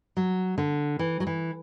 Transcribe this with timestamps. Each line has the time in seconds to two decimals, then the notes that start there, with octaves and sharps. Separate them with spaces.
0.17 F#3
0.58 D3
0.99 E3
1.20 F#3
1.27 E3